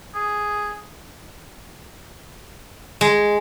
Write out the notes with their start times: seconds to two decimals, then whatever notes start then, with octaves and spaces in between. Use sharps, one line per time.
0.15 G#4
3.01 G#3